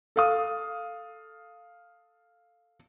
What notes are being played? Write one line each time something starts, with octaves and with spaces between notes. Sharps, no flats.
A4 F5 D#6